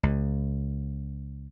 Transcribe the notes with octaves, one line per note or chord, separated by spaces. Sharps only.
C#2